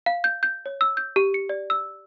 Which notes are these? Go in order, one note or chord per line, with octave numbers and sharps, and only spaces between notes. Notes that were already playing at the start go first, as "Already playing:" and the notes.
F5
G6
G6
C#5
E6
G6
G4
C#7
D5
E6